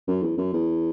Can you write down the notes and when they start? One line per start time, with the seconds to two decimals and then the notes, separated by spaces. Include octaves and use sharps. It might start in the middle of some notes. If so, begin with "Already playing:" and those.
0.08 F#2
0.22 E2
0.38 F#2
0.53 E2